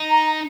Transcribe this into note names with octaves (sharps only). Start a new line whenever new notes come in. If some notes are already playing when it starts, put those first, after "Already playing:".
Already playing: D#4
A#5